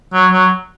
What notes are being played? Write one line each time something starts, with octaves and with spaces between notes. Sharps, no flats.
F#3
F#3